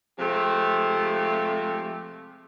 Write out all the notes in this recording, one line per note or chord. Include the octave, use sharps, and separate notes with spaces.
C3 F3 G#3 A3 G4